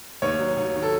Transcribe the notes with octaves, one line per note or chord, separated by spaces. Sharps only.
D#2 C#5
F#3
D#2
D#3
A4